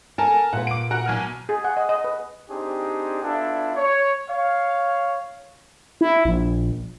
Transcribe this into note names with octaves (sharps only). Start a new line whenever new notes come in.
A4 A#4 G#5 A5
A#2 B4 F#5
D6 D7
F#4 A#4 F#5
B1 G#5 F6
G#4
F#5
D#5
D#5
B4
C4 D4 D#4 G4 G#4
B3 D4 E4 F4 A4
C#5
C#5 F5
E4
A#1